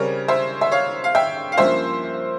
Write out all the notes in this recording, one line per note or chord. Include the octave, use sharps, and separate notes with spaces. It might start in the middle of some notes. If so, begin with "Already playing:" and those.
Already playing: C#3 G3 C4 A#4 C#5
C5 E5
E5
C#5 F5
F5
E5 G5
F5
G2 F3 A#3 C#4 C5 E5